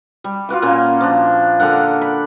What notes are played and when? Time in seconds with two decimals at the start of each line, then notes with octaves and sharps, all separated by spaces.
0.24 G3
0.49 F4 F#4 B4 D6
0.62 A#2 A#3 C#4
1.01 F3 D4
1.60 D3 G4 A#4 F#5
2.02 B5